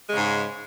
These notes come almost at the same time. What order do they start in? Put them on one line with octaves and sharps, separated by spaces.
G#3 C#3 G#2